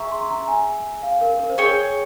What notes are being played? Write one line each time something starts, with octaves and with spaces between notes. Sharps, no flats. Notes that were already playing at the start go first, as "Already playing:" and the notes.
Already playing: G#4 E5 A#5 C#6
C6
A#5
G#5
F5
A#4
A#4
C5
G#4 A#4 C#5 G5